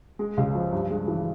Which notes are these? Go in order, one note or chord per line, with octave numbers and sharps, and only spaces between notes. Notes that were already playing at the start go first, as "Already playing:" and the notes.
G#3
C#2
F3
G2
G#3
E3